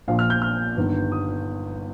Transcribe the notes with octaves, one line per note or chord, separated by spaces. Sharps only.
A#1 A#2 F3 F5
F6
G6
F6
G1 G2 D#3
D#6